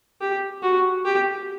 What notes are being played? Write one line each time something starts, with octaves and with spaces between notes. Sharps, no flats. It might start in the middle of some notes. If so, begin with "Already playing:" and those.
G4
F#4
G4